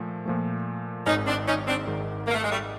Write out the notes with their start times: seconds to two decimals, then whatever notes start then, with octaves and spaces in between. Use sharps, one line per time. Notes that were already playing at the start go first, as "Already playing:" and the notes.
Already playing: A#2 F3 A3
0.25 A#2 F3 A3
1.06 G#1 G#2 D#3 C#4 D#4
1.27 C4 D4
1.47 C#4 D#4
1.66 C4 D4
1.86 G#1 G#2 D#3
2.27 A#3
2.34 A3
2.43 G#3
2.50 G3 A3